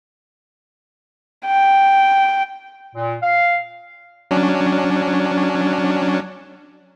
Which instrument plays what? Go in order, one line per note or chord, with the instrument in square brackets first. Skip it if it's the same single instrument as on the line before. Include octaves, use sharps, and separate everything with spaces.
[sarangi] G5
[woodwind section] A#2
F5
[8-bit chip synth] F#3 C#4 D4